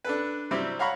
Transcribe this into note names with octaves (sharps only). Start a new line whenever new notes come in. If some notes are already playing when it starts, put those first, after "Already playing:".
D4 A4 B4
C3 F#3 G3 C4 E4
C#5 F5 F#5 A#5 B5 C#6